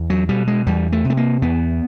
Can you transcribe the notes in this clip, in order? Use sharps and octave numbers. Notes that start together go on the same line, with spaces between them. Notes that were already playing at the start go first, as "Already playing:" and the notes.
Already playing: E2
F#3
B2 G3
G#3
E2 G3
A3
C3
A3
A#3
E2 B3